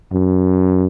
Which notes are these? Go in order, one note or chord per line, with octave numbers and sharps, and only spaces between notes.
F#2